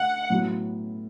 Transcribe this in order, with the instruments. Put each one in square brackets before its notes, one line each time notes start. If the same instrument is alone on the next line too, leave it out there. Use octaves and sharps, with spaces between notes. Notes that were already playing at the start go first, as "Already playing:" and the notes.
Already playing: [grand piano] D3 A3 [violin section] F#5
[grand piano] A2 F#3 B3 F#4